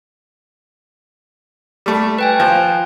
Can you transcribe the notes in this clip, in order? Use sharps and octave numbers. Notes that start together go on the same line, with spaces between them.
G3 A3
B4 G5 G#5
F3